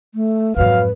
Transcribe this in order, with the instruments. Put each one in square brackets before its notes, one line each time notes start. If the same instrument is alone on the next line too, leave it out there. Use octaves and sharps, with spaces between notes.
[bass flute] A3
[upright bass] F2 G#2 [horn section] F#3 F5 [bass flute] B4